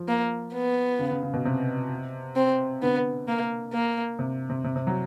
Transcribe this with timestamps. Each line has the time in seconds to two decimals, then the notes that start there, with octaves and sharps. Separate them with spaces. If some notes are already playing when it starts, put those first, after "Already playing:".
Already playing: F3
0.08 A#3
0.54 B3
0.99 C#3
1.11 C#3
1.23 C#3
1.33 B2
1.45 C3
2.36 C4
2.82 D3 B3
3.28 A#3
3.73 A#3
4.19 C3
4.50 C3
4.64 C3
4.76 C3
4.87 F#3